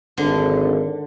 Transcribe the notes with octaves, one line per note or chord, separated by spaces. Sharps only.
G#1 D3